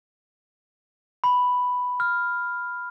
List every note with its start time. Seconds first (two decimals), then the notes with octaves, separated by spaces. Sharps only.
1.24 B5
2.00 F6